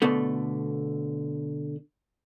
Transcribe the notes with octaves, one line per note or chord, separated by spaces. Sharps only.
B2 D3 A3